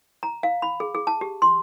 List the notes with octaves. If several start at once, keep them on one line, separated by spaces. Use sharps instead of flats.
A#5
F5
B5
G#4
G#4
A5
G4
C6